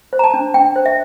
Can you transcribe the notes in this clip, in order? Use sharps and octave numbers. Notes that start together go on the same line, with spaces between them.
C5
A#5
A5
D4
D4 G5
C5
E5